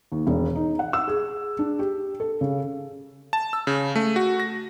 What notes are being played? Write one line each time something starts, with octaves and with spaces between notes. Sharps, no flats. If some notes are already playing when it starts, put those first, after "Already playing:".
D#2
E1
D#4
F#5
E6
G#4
D4
G4
A4
C#3
A5
E6
C#3
A3
F#4
A#6